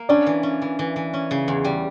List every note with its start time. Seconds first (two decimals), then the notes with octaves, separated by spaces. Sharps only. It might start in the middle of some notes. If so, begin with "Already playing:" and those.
Already playing: A#3
0.09 C#4 D4 D5
0.27 E3
0.43 C#4
0.62 E3
0.79 E3
0.96 E3
1.13 C#4
1.31 C#3
1.48 E2
1.65 G3